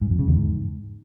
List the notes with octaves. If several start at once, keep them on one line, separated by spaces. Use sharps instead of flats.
G#2
F2
C#3
E2
G#2